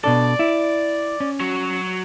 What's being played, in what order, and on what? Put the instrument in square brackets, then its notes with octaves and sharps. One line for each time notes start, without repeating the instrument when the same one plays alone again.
[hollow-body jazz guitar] B2 D4 A4 [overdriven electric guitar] D5
[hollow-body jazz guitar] E4
C#4
[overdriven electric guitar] F#3 F#4